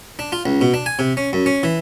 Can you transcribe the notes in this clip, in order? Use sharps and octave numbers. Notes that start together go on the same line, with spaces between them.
D4
F4
C#2
B2
D4
G#5
C3
C#4
F#2
C#4
E3